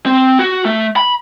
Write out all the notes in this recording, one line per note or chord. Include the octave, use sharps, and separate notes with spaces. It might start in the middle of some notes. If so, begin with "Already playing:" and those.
C4
F#4
A3
B5